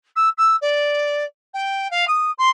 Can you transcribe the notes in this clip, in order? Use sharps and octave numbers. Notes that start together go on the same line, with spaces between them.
E6
E6
D5
G5
F5
D#6
C6